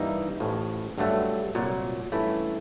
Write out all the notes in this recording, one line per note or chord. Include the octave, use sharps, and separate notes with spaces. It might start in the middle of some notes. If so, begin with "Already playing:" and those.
Already playing: G2 E3 G3 A#3 D#4
A1 A2 F3
G1 G2 D3 F#3 A3
C2 A#2 F#3
G2 E3 A3 C#4 E4